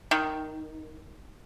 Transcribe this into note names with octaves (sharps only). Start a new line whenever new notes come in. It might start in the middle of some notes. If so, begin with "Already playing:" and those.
D#3